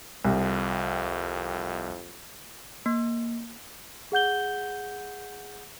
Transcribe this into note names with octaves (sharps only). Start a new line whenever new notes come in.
C2 F2
A#3
G#4 F#5 G6 G7